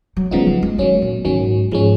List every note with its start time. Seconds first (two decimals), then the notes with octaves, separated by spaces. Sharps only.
0.17 F#3
0.31 C#3 F3 G#3 B3 D#4
0.47 F#3
0.63 G#3
0.78 D#3 F#3 G#3 C#4
1.02 A#2
1.25 G#2 D#3 F#3 C#4
1.71 G#2 F3 G#3 C#4